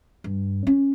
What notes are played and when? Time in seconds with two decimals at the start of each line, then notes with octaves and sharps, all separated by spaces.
0.24 G2
0.67 C#4